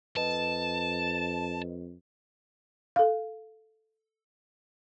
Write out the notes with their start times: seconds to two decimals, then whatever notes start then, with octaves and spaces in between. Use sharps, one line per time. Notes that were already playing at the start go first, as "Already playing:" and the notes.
0.17 F2 B4 D#5 A5
2.96 A4 F5